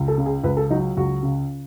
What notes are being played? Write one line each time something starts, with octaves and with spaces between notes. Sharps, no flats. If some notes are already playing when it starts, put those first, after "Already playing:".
Already playing: C#2
A4
C#3
G#4
C#2 B4
A4
F#3 D#4
C#2 F#4
C#3